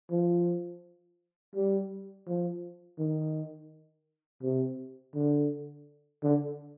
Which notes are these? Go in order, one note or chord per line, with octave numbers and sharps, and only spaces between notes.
F3
G3
F3
D#3
C3
D3
D3